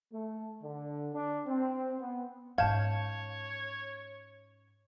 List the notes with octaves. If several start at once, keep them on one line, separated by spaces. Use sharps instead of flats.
A3
D3
D4
C4
B3
G#2 C#4 C#5 F5 A5 G6 G#6